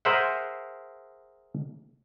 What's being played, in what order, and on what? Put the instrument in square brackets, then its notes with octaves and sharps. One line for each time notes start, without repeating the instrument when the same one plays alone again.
[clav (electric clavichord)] G#4 A#4 C5 E5 F#5